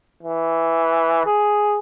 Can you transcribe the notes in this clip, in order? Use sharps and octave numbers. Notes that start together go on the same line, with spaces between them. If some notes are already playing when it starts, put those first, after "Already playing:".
E3
G#4